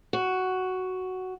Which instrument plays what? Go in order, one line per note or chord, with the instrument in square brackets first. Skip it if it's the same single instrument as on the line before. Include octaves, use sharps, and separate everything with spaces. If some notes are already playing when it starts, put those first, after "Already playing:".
[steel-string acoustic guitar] F#4